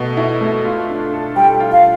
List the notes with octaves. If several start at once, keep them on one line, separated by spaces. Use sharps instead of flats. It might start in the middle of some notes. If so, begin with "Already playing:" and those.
Already playing: B2 A3
E4
A3
F4
D4
A4
G3 G5
F4
F5